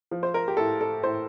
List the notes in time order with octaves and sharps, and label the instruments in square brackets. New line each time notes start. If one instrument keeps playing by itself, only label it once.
[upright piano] F3
C5
A#4
G4
A2 A4
A4
A2 C5